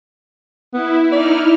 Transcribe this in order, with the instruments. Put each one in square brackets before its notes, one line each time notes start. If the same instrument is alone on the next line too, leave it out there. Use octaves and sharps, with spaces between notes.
[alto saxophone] B3 [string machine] E4
[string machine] D#4 E4 F6 [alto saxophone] D5